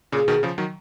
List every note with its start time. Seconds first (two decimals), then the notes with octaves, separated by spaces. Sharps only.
0.12 A#2 C#3 G#4
0.28 B2 D#3
0.43 C#3 F3
0.58 D#3 F#3